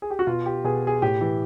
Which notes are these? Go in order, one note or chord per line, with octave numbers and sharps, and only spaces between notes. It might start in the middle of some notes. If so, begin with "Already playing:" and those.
G#4
G4
F#4
B2 F4
G4
B2 G#4
G#4
A2 G4
E3